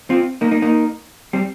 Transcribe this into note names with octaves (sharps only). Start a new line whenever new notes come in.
C4 F4
A#3 D#4
A#3 D#4
A#3 D#4
G3 C4